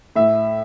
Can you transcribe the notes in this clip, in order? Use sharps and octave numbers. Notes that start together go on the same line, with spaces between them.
A2 E5